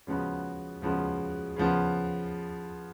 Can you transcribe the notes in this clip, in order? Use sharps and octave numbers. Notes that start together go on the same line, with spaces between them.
C#3 F3 G#3 B3 F#4
C#3 F3 G#3 B3 F#4
C#3 F3 B3